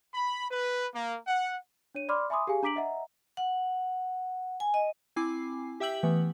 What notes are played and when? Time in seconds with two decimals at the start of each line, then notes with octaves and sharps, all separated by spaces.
0.14 B5
0.50 B4
0.93 A#3
1.27 F#5
1.95 D4 C#5 D#7
2.09 D5 B5 C6 D6 F6
2.30 E5 G#5 B5 C6 D6 D#6
2.47 G4 G#4 F5 G#5
2.63 D4 A#5 D6 B6 D7 F#7
2.76 D#5 E5 F#5 A#5
3.37 F#5
4.60 G#5
4.74 D#5
5.16 C4 E4 G#5 D6 C7
5.80 G4 E5 G5 E6 G6 F#7
6.03 E3 A3 B3